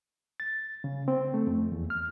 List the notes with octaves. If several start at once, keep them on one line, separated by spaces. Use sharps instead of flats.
A6
C#3
C4
A3
F2
E2
F6